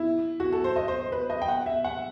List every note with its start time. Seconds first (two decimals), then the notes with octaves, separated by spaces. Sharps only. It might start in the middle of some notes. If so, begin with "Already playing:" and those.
Already playing: E4
0.40 F#4
0.52 A4
0.64 C5
0.76 D#5
0.88 C5
1.00 C5
1.12 B4
1.30 D#5
1.42 G5
1.48 F#5
1.66 E5
1.85 F#5